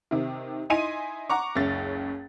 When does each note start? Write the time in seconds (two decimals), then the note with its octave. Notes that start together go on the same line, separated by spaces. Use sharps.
0.11 C3 D#3
0.70 D#4 E4 D#5 G#5 C6 D#7
1.30 F#5 A#5 C#6 D6
1.56 F#1 C#2 C#4 A6